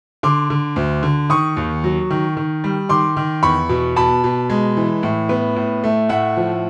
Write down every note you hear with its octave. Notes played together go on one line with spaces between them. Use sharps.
D3 C6 D6
D3
D2
D3
D#3 C#6 D#6
D#2
F#3
D#3
D#3
G3
D#3 C6 D6
D#3
E2 B5 C#6
B2
B2 A5 B5
B2
G#3
E3
A2
B3
A2
A3
A2 E5 F#5
F3